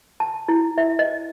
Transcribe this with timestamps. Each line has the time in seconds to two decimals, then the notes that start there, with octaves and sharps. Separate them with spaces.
0.20 A5
0.48 E4
0.78 E5
0.99 D#5